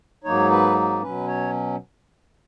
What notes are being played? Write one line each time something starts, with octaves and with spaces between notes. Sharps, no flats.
G#2 F#3 A#3 D#4 C#5
B4
B2 F#3 C#4 B4
C#5